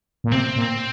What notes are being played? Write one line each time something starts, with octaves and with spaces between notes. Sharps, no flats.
A#2
C3 C4
A#2